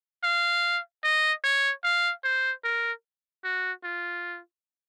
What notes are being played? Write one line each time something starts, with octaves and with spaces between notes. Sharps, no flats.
F5
D#5
C#5
F5
C5
A#4
F#4
F4